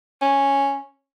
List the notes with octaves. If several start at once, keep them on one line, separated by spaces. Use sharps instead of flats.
C#4